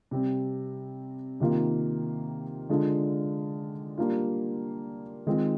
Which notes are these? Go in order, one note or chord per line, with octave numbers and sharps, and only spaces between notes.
C3 G3 C4
C3 D#3 A#3 F4
D3 G#3 D4 F4
G3 A#3 D4 F4
D#3 G#3 C4 F4